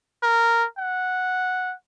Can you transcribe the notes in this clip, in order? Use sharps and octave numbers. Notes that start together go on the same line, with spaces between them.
A#4
F#5